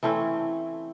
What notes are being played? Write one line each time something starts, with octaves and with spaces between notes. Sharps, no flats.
E3 A3 C4 C#4